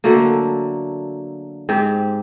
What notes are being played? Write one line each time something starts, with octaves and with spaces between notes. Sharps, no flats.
D3 F#3 A3 A#3
G#2 C4 G4